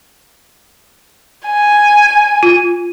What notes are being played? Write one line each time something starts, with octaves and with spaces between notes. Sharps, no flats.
G#5
F4